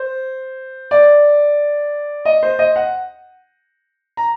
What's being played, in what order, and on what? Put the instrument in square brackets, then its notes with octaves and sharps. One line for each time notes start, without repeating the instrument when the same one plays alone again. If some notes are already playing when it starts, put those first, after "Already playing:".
Already playing: [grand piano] C5
D5
D#5
C5
D#5
F#5
A#5